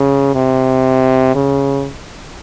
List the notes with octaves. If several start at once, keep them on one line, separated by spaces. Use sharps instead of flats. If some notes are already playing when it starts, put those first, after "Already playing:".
Already playing: C#3
C3
C#3